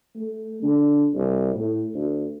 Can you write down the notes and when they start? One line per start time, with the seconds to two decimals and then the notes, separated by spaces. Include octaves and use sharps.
0.16 A3
0.62 D3
1.14 C2
1.55 A2
1.95 D2